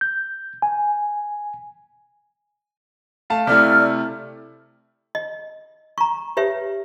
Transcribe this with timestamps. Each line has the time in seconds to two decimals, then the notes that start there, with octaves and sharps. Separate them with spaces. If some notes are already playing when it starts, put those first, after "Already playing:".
0.01 G6
0.62 G#5
3.30 A3 F5 A5
3.47 C3 A3 E4 D5 F6
5.15 D#5
5.98 A#5 C#6
6.37 G4 B4 C#5 E5